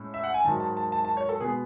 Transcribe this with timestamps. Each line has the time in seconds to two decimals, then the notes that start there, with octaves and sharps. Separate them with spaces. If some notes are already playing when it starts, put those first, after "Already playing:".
Already playing: A2 G#3 C#4
0.14 E5
0.24 F#5
0.34 G#5
0.44 G#2 D#3 F#3 A5
0.60 A5
0.77 A5
0.92 A5
1.05 A5
1.17 C#5
1.29 A4
1.40 B2 G#3 B3 G#4